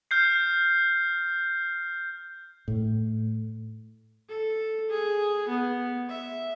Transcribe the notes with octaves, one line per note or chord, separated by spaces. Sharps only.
F6 G6 C7
A2
A4
G#4
B3
E5